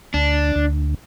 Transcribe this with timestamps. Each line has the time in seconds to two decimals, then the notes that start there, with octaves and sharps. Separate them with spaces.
0.14 D2 D4
0.56 D2